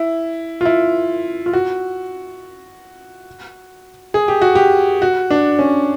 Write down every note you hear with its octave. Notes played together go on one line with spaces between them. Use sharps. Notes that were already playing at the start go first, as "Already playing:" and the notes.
Already playing: E4
F4
E4
F4
F#4
G#4
G4
F#4
G4
F#4
D4
C#4